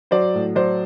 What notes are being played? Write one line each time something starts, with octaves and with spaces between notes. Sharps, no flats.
F#3 C5 D5
A2
F#3 C5 D5